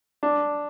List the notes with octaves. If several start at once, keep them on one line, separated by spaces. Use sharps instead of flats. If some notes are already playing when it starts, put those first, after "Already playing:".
D4